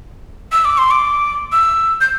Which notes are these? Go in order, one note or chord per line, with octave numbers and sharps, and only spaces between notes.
E6
D6
C6
D6
E6
G6